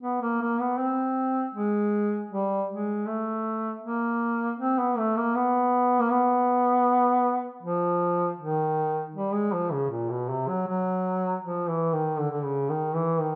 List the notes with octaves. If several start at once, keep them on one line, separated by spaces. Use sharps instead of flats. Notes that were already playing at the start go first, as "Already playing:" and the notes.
B3
A#3
A#3
B3
C4
G#3
G3
G#3
A3
A#3
C4
B3
A3
A#3
B3
A#3
B3
F3
D#3
G3
G#3
F3
C#3
A#2
B2
C3
F#3
F#3
F3
E3
D#3
D3
D3
C#3
D#3
E3
D#3